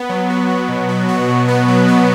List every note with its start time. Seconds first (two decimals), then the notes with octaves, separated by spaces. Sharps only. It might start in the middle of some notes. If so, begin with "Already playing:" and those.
Already playing: B3
0.09 F#3
0.30 F#4
0.50 B3
0.68 B2
0.89 F#4
1.09 F#4
1.28 B2
1.48 B3
1.68 F#3
1.88 B3